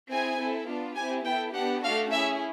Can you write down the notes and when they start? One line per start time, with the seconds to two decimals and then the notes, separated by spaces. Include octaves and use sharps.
0.10 C4 E4 G#4 G#5
0.39 C4 E4 A4
0.68 B3 D4 F4
0.97 C4 E4 G4 G#5
1.26 B3 E4 A4 G5
1.54 B3 D4 G4 F#5
1.83 A3 D4 F#4 A4 F5
2.12 C#4 E4 G#4 E5